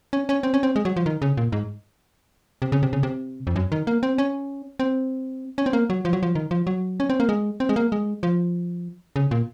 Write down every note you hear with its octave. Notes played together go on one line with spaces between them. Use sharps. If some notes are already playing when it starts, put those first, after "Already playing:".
C#4
C#4
C4
C#4
C4
G#3
F#3
F3
D#3
C#3
A#2
G#2
C3
C#3
C3
C#3
C3
F2
F#2
D#3
A#3
C4
C#4
C4
C#4
C4
A#3
F#3
F3
F#3
F3
D#3
F3
F#3
C#4
C4
A#3
G#3
C4
G#3
A#3
G#3
F3
C#3
A#2